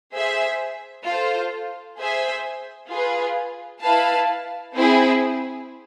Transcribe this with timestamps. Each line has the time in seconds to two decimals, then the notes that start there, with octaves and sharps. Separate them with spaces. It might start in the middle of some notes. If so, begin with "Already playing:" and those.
0.13 G#4 C5 E5
1.06 F4 A4 C5
1.98 G#4 C5 E5 G#5
2.90 F4 G#4 B4
3.82 E4 B4 F5 A5
4.75 C4 E4 G#4